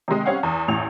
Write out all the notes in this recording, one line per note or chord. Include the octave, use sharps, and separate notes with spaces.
C3 D#3 G#3 D#5
G3 C4 C#4 C#5 F5 F#5
E2
A1 E2 A2 C#6 F7